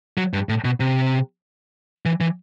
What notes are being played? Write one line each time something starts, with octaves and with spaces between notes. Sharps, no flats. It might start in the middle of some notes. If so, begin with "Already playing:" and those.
F#3
G2
A2
B2
C3
E3
E3